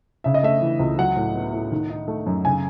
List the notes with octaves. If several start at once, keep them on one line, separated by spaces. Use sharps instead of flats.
C#3 E5
D#5
A3 E5
E3
C#2
F#3 F#5
A2
B3
A2
D#3
D#4
A3
F#2
C#3 G#5